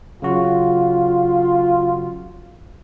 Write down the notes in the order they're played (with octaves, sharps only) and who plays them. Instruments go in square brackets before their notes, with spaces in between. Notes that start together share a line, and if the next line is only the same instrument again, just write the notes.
[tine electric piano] C#3 F#3 F#4 [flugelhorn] F4